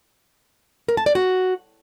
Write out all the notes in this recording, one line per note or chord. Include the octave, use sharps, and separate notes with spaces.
A#4
A5
D5
F#4